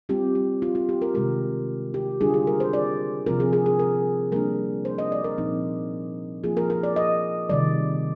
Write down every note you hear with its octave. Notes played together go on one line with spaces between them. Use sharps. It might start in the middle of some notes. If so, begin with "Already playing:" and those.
G3 C4 F4 G4
G4
F4
F4
G4
A#4
C3 D#3 G#3 A#4
G4
D3 G3 D4 F4 G#4
G#4
A#4
C5
D5
C3 F3 C4 F4 A#4
G#4
G#4
G#4
A#4
G3 A#3 D4 A#4
C5
D#5
D5
A#4
A#2 F3 C4 D#4
F3 A#3 F4 G#4
A#4
A#4
D5
D#5
C3 D#3 G3 D5